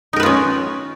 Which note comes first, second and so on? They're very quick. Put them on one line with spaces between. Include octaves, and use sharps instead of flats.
D#4 A#4 B4 F4 C#4